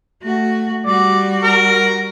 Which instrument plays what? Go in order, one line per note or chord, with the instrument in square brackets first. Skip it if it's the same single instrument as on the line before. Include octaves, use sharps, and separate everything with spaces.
[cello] A3 F#4
[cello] G3 F#4 [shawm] D5
[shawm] A#4